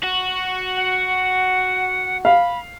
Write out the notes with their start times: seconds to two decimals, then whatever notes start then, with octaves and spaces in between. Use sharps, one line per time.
0.03 F#4
0.77 F#5
2.25 F5 B5